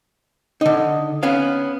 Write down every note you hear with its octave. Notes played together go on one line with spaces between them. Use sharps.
D3 D#4
B3 C#4 F5